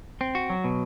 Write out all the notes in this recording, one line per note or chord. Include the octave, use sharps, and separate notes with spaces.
C4
F#4
F#3
B2